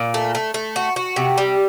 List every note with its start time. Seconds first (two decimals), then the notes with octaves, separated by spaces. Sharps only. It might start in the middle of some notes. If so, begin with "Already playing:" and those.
Already playing: A#2
0.14 A3
0.35 A3
0.54 A3
0.76 F#4
0.96 F#4
1.16 C3
1.38 G3